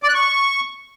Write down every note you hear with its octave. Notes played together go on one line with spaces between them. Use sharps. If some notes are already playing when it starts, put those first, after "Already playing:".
D5
F#6
C#6